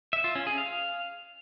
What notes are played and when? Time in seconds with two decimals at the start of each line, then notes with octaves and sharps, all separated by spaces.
0.13 E5
0.24 F4
0.35 C#4
0.47 G#4
0.58 F5